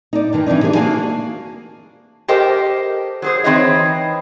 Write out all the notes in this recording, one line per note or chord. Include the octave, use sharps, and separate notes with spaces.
D#4 D5
G2 D#3 E3
E3 F3 C4 D4 D#4
D3 E3 G4 G#4 C5
A#3 D4 F#4 F5 G#5
G4 A4 A#4 C5 D#5 G5
F#3 G#4 C5
E3 C4 D#4 B4 C#5 D#5